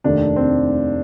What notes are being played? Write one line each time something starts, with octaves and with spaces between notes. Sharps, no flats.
F1 D#2 D#3 A3 D4
C4